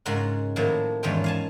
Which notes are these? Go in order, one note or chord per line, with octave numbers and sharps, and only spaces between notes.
G#2 C#3 G#3 F4 A#4 F#5
A2 D#3 F3 F#3 A3 A#3
E2 G#2 D#3 C#4 F4 G5
F5 G#5 A5